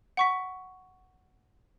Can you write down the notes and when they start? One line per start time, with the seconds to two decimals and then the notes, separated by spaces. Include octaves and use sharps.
0.17 F#5 C#6 B6